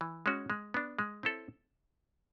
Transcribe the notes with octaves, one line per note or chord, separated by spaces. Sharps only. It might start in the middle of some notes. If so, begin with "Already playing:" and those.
E3
G#3 C#4 F#4
G#3
B3 D4
G#3
C4 E4 A4 C#5